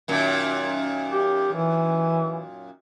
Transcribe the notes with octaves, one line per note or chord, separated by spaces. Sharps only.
F#2 A#2 D#3
G4
E3